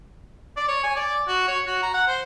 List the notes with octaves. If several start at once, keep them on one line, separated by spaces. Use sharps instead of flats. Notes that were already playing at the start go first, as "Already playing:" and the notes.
D5
C#5
G#5
D5
F#4
C#5
F#4
A#5
F#5
C5